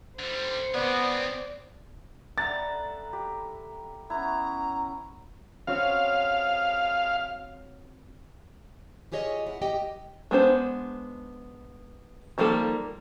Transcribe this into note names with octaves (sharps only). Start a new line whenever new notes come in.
D3 G3 C5
B3 C4 G#4 D5
D3 G3 E5 F#5 A#5 A6
G4 B5
B3 C#4 E4 A#5
C4 F#4 C#5 F5
F4 G4 G#4 C#5 D#5
E4 F#5
G4 D#5 G5
G#3 B3 D4 C5
D#3 F3 G3 A#3 A4